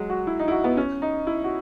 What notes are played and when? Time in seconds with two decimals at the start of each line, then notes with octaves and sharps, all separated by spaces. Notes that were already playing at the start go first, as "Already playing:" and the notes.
Already playing: F#3 G#3
0.10 F#4
0.27 E4
0.39 D#4
0.48 E4
0.51 F#4
0.64 B3
0.77 C#4
1.02 D#4
1.27 E4
1.44 F#4